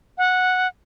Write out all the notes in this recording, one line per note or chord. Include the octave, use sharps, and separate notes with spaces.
F#5